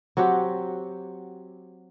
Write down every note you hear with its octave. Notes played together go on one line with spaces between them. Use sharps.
F#3 C4 F#4 G4